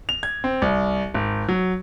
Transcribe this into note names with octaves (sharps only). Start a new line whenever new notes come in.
F7
G#6
C4
C2
G#1
F#3